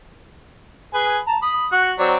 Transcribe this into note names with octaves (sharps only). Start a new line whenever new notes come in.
G#4 B4 G#5
A5 A#5
B5 D#6
F#4 F#5
F#3 C4 D5